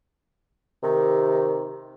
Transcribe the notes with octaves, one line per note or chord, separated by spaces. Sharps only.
C3 D#3